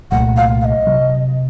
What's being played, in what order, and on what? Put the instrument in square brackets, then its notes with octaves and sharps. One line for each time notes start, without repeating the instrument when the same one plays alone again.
[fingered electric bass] C2 A#2 F#3 A3 [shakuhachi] F#5
[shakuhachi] F5
F5
D#5
[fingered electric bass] C3 F#3